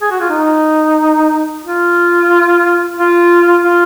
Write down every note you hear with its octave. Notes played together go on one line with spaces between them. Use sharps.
G#4
F#4
F4
D#4
F4
F4
F4